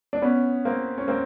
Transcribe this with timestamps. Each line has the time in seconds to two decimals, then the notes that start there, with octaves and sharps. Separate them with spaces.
0.13 D4
0.22 B3 C#4
0.65 A#3 C4
0.98 C#4
1.08 A#3 C4